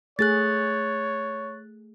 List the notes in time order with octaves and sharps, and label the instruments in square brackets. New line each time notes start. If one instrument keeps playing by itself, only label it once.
[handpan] A3 G#4 [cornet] C#5 [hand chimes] F#6 A6